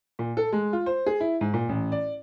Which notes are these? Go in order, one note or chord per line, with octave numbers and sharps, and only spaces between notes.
A#2
A4
G#3
F4
C5
G#4
E4
G#2
A#2
A1
D5